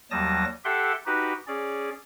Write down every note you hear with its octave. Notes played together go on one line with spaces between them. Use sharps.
D#2 F#3 G3 A5 D#6 A#6
G4 A4 E5 F#5 G5 C6
D#4 F#4 G4 B4
C#4 G#4 D5